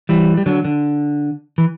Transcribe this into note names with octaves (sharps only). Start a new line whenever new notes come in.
E3 G3
G3
D3 F#3
D3
E3